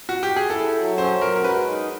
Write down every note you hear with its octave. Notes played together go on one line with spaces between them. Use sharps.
F#4
G4
G#4
E4 A4
F#3
C#4 C5
F#3 A#4
A#4
G#3 B4
D#4